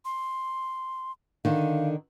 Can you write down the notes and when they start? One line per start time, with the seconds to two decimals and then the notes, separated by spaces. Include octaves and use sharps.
0.05 C6
1.45 D3 D#3 F5